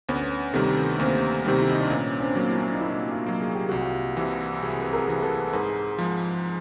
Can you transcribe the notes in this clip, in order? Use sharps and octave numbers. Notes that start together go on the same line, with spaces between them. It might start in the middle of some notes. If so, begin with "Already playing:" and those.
D2 B3 C#4
C3 D#3 G3 A3 B3
D2 A#3 C4
C3 D#3 G3
E4
D#4
D4
A#2 B3 C#4
C4 D4
F#3 A#3
D4 E4
D4
D#4
A#2 D4 E4
D#4 F4
F#3 A#3
G#4
G4
C2 F#4
F4 G4
C3 E3
C2 F#4 G#4
B4
G#4 A#4
C3 E3
A4 B4
G#2 G#4 A#4
F3 G#3